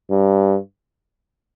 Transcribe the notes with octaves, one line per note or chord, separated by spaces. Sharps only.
G2